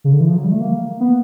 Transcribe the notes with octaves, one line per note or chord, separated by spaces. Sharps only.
C#3
D3
E3
F3
F#3
G3
A3
A#3
B3